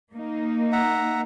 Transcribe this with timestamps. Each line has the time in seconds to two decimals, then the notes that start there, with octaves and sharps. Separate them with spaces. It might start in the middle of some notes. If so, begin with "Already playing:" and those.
0.13 A#3 D#4
0.72 E5 F#5 A#5